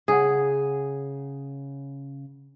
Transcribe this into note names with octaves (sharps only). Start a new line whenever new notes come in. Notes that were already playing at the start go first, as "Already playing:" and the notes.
C#3 G#4 F#5